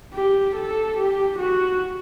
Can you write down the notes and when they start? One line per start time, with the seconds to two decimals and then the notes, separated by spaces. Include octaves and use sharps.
0.14 G4
0.56 A4
0.98 G4
1.39 F#4